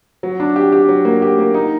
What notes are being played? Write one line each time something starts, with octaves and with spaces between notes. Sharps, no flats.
F#3
D4
G4
G4
F#3
A#3
G4
A#3
D#4